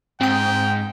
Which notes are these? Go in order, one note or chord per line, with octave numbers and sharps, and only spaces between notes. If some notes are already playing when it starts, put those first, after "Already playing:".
G#2 C4 G5 D#6